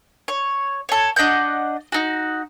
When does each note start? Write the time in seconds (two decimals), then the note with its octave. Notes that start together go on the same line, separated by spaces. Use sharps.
0.28 C#5
0.89 A4 C#5
1.16 D4 D#5 F#5 G6
1.92 D#4 F#4